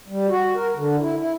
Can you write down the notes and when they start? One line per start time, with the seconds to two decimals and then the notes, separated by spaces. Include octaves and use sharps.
0.08 G3
0.29 F#4
0.55 A#4
0.75 D3
1.00 E4
1.19 E4